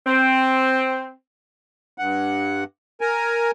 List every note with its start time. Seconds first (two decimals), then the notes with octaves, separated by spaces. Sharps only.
0.06 C4
1.98 G2 F#5
3.01 A#4 G#5